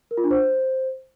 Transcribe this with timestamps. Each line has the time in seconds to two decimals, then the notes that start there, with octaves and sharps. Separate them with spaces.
0.11 A#4
0.17 F4
0.24 D4
0.31 C5